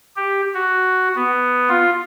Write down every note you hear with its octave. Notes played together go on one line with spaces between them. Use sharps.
G4
F#4
B3
F4